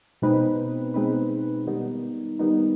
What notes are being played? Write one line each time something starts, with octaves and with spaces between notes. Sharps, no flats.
B2 G#3 C4 D#4 B4
B2 G#3 C4 D#4 B4
D#3 G3 B3 D#4
D#3 G3 B3 D#4